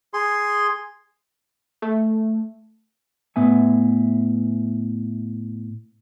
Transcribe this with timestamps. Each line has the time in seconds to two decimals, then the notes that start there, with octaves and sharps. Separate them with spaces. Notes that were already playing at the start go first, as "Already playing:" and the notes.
0.14 G#4 C6
1.82 A3
3.36 A2 B3 E5 G#5